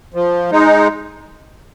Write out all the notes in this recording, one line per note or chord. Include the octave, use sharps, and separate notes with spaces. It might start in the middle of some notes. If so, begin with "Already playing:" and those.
F3
G#3 D#4